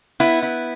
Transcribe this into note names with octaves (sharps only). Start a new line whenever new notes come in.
B3 E4
E4